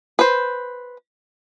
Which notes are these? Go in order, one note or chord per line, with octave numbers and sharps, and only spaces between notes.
B4 C5